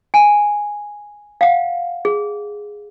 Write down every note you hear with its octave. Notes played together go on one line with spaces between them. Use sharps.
G#5
F5 F#5
G#4